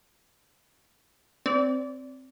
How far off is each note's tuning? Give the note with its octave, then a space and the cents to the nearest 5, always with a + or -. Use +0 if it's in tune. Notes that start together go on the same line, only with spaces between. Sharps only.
C4 +0 D5 -25